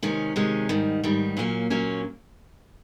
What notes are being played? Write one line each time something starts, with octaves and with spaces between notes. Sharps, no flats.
C3 D#3 G#3 C#4
C3 D#3 G#3 C#4
G#2 D#3 G3
G#2 D#3 G3
A#2 F#3 A#3 C#4
A#2 F#3 A#3 C#4